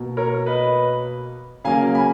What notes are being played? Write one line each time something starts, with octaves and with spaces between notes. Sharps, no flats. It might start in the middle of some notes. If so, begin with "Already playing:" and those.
Already playing: B2 A#3
A#4 C#5
B4 D#5
C#3 F#3 A#3 F5 G#5
G#5 B5